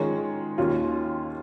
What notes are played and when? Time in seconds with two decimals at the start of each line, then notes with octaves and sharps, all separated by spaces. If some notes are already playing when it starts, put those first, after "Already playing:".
Already playing: D#3 G#3 C#4 F4 C#5
0.58 D#2 D#3 C#4 F4